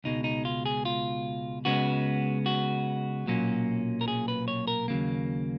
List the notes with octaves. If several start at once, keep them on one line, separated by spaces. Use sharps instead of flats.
C#2 B2 G#3 D#4
D#4
F4
G#4
F4
C#2 C#3 G#3 B3 F#4
F#4
B1 A#2 F#3 A#3 C#4
A#4
G#4
B4
C#5
A#4
D#2 C#3 F#3 A#3